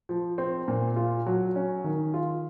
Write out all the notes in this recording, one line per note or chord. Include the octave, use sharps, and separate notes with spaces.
F3
C4
A#2
F4
F#3
C#4
D#3
F4